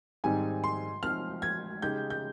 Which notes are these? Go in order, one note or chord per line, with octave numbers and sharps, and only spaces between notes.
G#2 D#3 G3 C4 D#4 G#5
C6
F3 C4 D#4 F6
G#6
C#3 G#3 D#4 G4 G6
G6